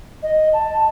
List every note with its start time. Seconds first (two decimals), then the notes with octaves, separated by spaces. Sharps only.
0.22 D#5
0.52 A5